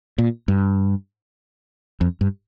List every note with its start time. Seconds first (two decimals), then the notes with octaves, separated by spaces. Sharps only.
0.18 A#2
0.48 G2
2.01 F2
2.21 G2